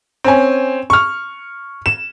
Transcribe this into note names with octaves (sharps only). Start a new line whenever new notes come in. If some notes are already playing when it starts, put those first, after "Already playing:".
C4 C#4 G#5
C#6 F6
E7